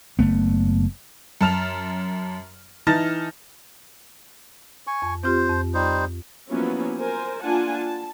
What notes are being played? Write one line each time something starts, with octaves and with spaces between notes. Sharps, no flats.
F#1 A3 B3
F#2 A5 F6 F7
E3 D#4 A5 F6 A6 A#6
G#5 C#6
F2
C4 F4 G4 C5
F2
G3 D#4 C5
F3 F#3 A#3 B3 C#4 E4
A#4 C5 G#5
A#3 D4 F4 F#5 G#5 A5
A5